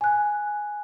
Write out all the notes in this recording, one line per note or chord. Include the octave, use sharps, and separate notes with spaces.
G#5 F#6